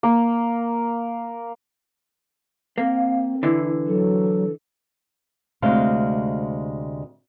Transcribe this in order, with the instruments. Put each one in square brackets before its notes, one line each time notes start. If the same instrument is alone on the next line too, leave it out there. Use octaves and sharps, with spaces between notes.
[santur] A#3
[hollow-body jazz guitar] A#3 [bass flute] C4 [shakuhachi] F5
[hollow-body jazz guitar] D3 E3 [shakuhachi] E4
[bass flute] F#3 [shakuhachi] A4
[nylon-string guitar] D2 C3 G#3 C5 F5